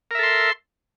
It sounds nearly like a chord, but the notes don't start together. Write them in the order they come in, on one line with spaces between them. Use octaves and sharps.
A#4 E5 A4 C6